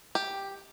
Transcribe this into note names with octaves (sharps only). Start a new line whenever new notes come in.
G4